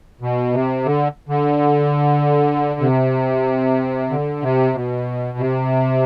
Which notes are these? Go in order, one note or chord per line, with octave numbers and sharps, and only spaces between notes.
B2
C3
D3
D3
C3
D3
C3
B2
C3